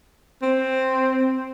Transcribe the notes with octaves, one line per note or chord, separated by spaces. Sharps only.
C4